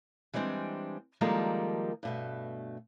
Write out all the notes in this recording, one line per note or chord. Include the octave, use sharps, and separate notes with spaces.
E3 G3 G#3 C4 D4
D#3 F3 G3 G#3 A#3 A4
G2 B2 A3